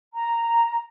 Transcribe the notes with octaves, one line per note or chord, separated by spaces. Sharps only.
A#5